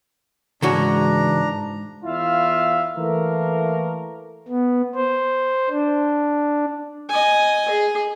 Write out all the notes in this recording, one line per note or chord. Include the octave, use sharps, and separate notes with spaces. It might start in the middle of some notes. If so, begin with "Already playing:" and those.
G#2 C#3 E3 D4 F#4 A#5
E2 E4 F4 E5 F5
E3 A3 A#3 A#4
B3
C5
D4
D#5 G#5
G#4